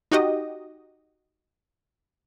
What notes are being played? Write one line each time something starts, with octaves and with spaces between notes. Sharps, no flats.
D#4 F#4 G4 D#5